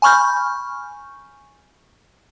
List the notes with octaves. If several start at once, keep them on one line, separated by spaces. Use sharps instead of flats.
G#5 B5 C#6 F6 G6